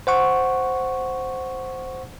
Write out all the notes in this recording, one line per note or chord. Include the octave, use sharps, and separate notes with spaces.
C5 F#5 C#6